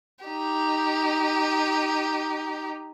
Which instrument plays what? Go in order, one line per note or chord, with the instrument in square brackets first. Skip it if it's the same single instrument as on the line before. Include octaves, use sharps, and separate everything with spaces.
[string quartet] D#4 G4